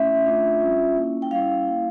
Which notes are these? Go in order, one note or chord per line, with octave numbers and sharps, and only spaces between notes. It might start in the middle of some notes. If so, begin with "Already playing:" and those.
Already playing: A3 C#4 E4 E5
A3 D4 F4
G3 C#4 F4
A#3 C#4 E4
G5
G3 C#4 E4 F5
A#3 E4